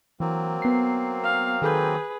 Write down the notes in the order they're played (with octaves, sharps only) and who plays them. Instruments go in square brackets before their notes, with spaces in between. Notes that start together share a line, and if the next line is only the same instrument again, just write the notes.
[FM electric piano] E3 [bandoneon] F#3 A#3 C4
[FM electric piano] B3 C7
[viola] F5
[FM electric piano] D#3 A4 G6 [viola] G#4 B4